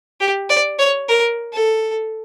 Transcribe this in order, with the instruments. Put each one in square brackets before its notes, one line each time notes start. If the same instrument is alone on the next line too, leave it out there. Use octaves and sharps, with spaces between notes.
[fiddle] G4
D5
C#5
A#4
A4